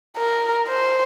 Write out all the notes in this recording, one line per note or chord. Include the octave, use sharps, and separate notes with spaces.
A#4
C5